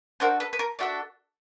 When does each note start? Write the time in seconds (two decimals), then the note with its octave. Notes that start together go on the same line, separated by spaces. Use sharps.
0.20 D4 F#4 A4 A#4 C5
0.40 A4 B4
0.53 B4
0.59 A#4
0.79 D4 F#4 A4 D5 E5